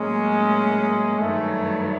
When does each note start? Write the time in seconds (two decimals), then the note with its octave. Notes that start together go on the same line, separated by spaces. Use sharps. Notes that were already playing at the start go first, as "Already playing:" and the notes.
Already playing: A2 F#3 G#3 A#3 C#4
1.20 G2 D#3 F#3 A3